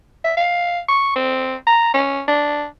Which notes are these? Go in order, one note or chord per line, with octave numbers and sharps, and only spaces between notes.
E5
F5
C#6
C4
A#5
C#4
D4